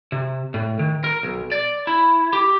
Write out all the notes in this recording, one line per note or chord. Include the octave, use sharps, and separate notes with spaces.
C3
A2
D#3
A#4
B1
D5
E4
G4